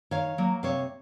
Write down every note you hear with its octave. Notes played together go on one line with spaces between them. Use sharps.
D#3 C#5 F5
F#3 A#3
C3 C#5 F5